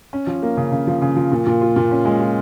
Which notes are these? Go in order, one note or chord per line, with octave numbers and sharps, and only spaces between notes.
C#4
F3
A#3
C#3
C#3
F3
C#3
F3
A#2
A#2
F4
A#2
C#4
G#3
F4